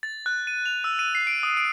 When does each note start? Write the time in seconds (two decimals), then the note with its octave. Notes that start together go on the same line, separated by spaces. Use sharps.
0.03 A6
0.26 F#6
0.47 D#7
0.66 F7
0.84 E6
0.99 D#7
1.15 C7
1.27 D7
1.43 D#6
1.57 D7